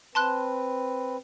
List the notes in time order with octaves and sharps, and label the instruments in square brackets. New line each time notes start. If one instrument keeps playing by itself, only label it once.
[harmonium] C4 B4 [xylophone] A5 C6 F#6